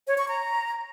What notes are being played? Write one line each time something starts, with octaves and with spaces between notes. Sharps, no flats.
C#5
C#6
A#5